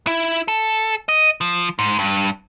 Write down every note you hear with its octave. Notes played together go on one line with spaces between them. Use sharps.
E4
A4
D#5
F3
G#2
G2